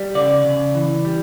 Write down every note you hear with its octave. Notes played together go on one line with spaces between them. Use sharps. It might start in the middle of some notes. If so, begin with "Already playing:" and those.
Already playing: G3
C#3 D5
C#3
E3
G3